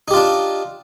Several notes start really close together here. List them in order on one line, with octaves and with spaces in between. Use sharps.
D#4 G4 F4 D4